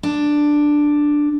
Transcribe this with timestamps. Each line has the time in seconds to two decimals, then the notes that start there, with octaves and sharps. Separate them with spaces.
0.03 D4